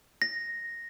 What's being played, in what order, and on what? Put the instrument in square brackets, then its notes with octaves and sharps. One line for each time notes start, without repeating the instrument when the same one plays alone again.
[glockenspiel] A#6